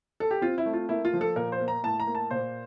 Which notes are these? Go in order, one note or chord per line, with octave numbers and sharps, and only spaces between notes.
A4
G4
C4 F4
E4
A3
F4
A#3 E4
F4
F3
A4
A#2 A#4
C5
A#3
A#5
A2 A5
A#5
A#3
A5
A#2 C5